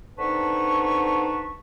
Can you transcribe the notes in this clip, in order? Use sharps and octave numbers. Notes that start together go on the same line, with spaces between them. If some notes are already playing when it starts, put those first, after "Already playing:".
D3 C4 D#4 B4 A5 C#6